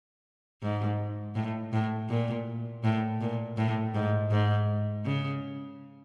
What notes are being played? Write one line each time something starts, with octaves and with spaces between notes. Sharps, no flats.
G#2
A2
A2
A#2
A2
A#2
A2
G#2
G#2
C#3